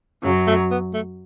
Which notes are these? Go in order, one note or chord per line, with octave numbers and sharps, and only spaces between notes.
F#2 C#3 F#3
A3
B3
A3